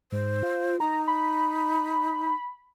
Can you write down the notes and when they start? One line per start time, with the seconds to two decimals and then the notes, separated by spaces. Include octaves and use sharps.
0.12 G#2 C5
0.43 F4
0.80 D#4 A#5
1.07 B5